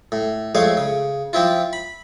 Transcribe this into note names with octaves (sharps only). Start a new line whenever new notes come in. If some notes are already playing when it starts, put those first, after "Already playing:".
A2
F2 G#3 A3 C#5 F5
C#3
F3 C4 E4 F4
B5